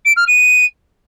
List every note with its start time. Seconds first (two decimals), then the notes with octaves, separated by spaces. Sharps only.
0.05 D7
0.16 F6
0.28 D#7